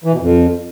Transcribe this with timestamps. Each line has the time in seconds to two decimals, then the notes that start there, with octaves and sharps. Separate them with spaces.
0.04 E3
0.12 B2
0.20 F2